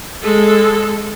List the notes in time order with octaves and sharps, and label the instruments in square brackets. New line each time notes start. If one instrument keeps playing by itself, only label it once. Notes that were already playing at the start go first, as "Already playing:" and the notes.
[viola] G#3 A4